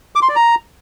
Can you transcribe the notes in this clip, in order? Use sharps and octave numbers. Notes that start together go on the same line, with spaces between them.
D6
C6
D5
A#5